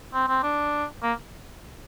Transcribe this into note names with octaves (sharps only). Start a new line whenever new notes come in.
C4
C4
D4
A#3